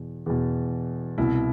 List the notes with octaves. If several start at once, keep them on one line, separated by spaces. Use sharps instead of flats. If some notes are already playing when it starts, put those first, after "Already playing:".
Already playing: E2 B2
E2 B2
C2 B2 E4